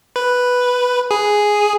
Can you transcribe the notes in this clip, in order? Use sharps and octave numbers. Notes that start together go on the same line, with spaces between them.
B4
G#4